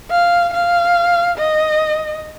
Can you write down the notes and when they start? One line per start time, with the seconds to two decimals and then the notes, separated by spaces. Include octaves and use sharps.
0.11 F5
0.53 F5
1.38 D#5